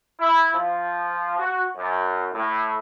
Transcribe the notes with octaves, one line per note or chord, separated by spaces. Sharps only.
E4
F3
F#4
F#2
A2